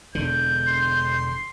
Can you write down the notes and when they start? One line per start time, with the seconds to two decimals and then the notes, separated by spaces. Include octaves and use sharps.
0.15 E1 D3 G6
0.67 C6